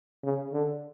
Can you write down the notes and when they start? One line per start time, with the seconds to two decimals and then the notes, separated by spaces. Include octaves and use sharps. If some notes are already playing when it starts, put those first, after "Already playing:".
0.24 C#3
0.53 D3